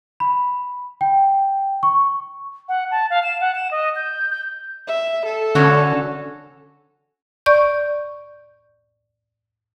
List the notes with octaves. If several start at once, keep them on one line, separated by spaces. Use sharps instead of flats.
B5
G5
C#6
F#5
A5
F5
E7
F#5
E7
D#5
G6
G6
E5
A4
D3 C#4 F#4
D5 C#6 G6